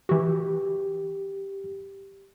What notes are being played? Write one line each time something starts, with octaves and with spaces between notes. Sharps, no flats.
E3 F#4 G4